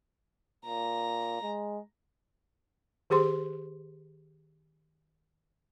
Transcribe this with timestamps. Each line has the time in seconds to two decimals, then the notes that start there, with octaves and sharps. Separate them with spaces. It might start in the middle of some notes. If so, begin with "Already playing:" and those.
0.65 A#2 A#5
1.42 G#3
3.10 D#3 G4 G#4 C5 C6